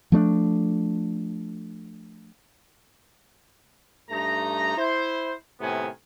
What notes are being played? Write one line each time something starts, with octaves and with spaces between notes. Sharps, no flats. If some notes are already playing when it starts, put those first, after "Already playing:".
F3 A3 C#4 D4
G2 A3 D#4 A#5
E4 C5
A2 C3 D#3 B3 G#5